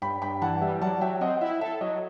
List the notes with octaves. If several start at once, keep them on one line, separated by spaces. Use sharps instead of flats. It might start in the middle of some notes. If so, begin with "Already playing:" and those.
G2 G5 B5
G2 G5 B5
E3 F#5 A5
G3 E5
F#3 F#5 A5
F#3 E5 G5
C4 D#5 F#5
E4 E5
A4 E5
F#3 D#5